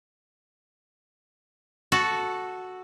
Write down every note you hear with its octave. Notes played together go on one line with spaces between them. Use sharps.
F#4 A4